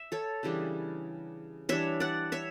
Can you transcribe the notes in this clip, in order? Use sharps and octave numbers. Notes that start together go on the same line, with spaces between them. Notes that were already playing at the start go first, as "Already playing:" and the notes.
Already playing: E5
A4 C#5
C#3 E3 G3 D4
E3 G3 D4 C#5 E5
D5 F#5
C#5 E5